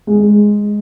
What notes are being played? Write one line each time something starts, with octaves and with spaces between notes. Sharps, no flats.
G#3